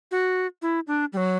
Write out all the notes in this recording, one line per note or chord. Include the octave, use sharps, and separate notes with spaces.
F#4
E4
D4
G3
F#3